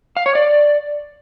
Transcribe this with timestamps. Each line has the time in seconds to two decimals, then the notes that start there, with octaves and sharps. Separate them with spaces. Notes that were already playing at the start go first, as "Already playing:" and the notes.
0.17 F5
0.26 C#5
0.35 D5